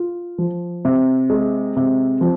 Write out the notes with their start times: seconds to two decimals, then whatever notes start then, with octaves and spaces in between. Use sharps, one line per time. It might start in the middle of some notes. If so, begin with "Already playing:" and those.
Already playing: F4
0.38 F3
0.85 C3
1.30 G#3
1.77 C3
2.21 F3